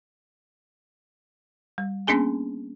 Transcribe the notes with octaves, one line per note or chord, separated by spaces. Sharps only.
G3
A#3 B3 C#4 D4 G#4 G#5